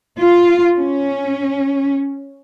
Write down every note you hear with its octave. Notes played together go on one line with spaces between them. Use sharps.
F4
C#4